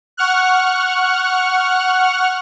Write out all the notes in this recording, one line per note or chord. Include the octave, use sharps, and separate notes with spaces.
F#5 C#6 F6 F#6